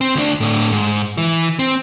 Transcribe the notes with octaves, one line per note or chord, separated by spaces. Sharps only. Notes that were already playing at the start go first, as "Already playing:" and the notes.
C4
D2 D4
A2 D3
G#2
E3
C4